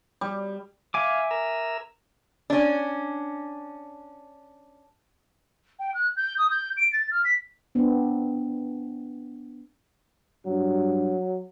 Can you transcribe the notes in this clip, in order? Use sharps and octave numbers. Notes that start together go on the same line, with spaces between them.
G3
E5 F5 G#5 D6
A#4 A#5 E6
C#4 D4
G5
F#6
G6
D#6
G6
D7
A6
F6
B6
B3 C4 D4
G2 F#3